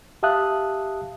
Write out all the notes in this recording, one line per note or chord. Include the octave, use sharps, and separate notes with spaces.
G4 E5 F5 A5 D#6 F#6